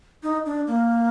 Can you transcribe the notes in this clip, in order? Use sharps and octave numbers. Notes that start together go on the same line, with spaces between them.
D#4
D4
A#3